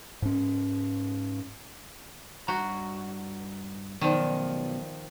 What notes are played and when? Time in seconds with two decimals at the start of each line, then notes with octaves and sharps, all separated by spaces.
0.22 G#2 C#4
2.48 G2 F#4 A#5
4.01 F#2 B2 D#3 F3 D5